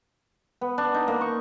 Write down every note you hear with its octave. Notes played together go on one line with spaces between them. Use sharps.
B3
D4
D#4
A#3
C#6